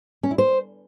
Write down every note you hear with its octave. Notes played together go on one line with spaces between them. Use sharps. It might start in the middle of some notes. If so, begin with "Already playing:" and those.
C#4
E4
C5